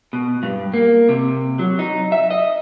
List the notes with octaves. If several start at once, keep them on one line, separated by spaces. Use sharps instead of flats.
B2
G2
A#3
C3
F#3
D#4
E5
D#5